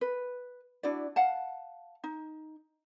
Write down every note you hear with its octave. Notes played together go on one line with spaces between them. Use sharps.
B4
D4 E4 F#4 D5
F5 F#5 A5
D#4